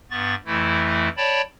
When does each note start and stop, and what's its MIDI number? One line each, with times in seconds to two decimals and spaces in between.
0.11 0.35 43
0.11 0.35 59
0.11 0.35 85
0.11 0.35 93
0.46 1.09 41
0.46 1.09 52
0.46 1.09 57
0.46 1.09 64
1.17 1.42 73
1.17 1.42 74
1.17 1.42 79
1.17 1.42 81
1.17 1.42 83